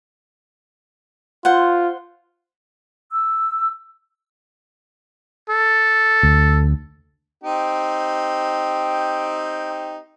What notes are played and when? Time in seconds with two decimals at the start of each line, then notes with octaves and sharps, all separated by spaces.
1.45 F4 C5 F#5
3.10 E6
5.50 A4
6.23 D2
7.44 C4 D#4 G4